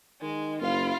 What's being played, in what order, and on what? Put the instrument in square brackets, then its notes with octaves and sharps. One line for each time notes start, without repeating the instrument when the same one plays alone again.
[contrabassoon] D#3 [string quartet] G#3
[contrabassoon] F#1 [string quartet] E4 F4 [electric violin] F5